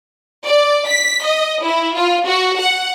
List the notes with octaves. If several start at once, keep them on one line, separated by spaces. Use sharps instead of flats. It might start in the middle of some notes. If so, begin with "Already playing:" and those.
D5
B6
D#5
E4
F4
F#4
F#5